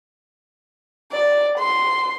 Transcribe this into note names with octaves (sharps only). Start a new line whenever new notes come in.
D5
C6